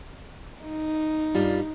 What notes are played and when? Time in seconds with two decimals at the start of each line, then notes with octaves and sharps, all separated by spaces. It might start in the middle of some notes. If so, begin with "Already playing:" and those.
0.63 D#4
1.35 G2 G3 F4